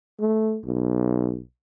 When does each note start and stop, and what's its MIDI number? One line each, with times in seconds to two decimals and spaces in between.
0.20 0.59 57
0.65 1.40 35